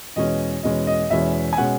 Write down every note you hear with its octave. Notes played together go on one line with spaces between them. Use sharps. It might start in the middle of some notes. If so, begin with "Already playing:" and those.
E2 B2 G#3 C#4 D#5
E2 B2 G#3 C#4 D#5
D#5
E2 B2 G#3 C#4 E5
G#5
B2 G#3 C#4 F#5